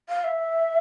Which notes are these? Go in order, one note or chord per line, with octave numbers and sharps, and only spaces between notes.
F5
E5